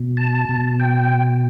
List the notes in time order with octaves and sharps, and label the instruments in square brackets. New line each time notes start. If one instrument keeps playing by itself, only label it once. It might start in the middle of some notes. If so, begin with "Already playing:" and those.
Already playing: [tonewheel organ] B2
A5
B2
G5